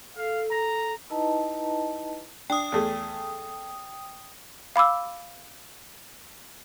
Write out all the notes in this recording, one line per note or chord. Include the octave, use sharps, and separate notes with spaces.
A4 F5
A#5
D#4 E4 B4 D#5 A5 A#5
D4 G5 D#6
E2 A3 G#4
F5 B5 D6 E6